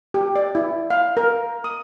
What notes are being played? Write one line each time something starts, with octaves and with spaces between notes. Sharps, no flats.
G4
D5
E4
F5
A#4
D#6